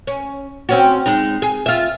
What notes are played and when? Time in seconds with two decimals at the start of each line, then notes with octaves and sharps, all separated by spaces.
0.07 C#4
0.69 C4 C#4 F#4
1.06 G#3 D#4
1.42 G#4
1.66 F4 E5